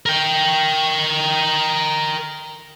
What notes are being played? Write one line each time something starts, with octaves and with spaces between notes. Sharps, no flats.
A#4 G5